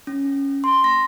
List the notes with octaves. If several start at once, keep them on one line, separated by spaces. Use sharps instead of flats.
C#4
C6
A#6